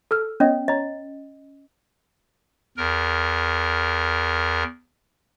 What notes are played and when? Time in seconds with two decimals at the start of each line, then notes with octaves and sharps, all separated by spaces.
0.11 A4 E6 F6
0.40 B3 C#4 C#5 D#5
0.68 C#5 D#5 A#5
2.77 E2 A#4